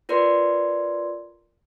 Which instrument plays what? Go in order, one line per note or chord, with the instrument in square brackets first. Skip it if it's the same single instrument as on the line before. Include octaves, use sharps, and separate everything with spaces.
[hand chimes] F4 A#4 B4 D5 C6